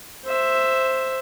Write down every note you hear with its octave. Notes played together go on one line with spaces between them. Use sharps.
C5 E5